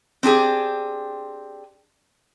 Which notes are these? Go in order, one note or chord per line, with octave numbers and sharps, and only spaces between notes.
C4 D4 G4 G#4